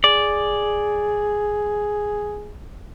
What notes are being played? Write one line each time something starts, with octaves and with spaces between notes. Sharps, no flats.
G#4 D5